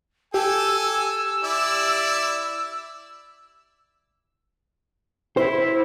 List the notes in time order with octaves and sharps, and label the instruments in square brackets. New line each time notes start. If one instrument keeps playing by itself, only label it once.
[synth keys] G4 [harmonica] A4 G#5 [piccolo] E6
[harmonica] E4 D5
[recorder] E4 [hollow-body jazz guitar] C5